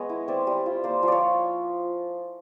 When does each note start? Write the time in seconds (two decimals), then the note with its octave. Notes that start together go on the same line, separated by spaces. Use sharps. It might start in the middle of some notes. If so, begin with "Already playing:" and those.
Already playing: G#3 B3 C#5 D#5
0.09 E4
0.28 C4 D5 E5
0.47 G3
0.66 F4
0.84 A#3 C5 D5
1.03 F3
1.08 C#5 D5